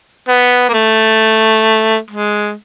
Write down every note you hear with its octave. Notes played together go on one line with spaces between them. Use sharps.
B3
A#3
A3
G#3